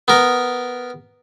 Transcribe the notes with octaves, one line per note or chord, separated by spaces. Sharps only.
B3 A#4